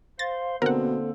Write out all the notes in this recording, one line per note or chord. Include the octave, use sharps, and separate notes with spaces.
C5 F5 C6 A6 A#6
B2 D3 A#3 C4 A4 A#4 F#5